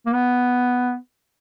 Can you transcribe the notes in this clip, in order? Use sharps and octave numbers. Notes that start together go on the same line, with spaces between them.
A#3
B3